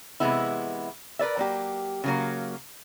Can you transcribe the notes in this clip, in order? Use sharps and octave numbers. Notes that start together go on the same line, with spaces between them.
C3 E3 G#3 B3 E4
A#4 B4 D5 E5
F#3 A#3 G4
C#3 F#3 A#3